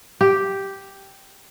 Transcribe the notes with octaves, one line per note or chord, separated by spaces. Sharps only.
G4